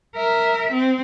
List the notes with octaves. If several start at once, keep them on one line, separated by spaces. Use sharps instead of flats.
A#4 E5
C4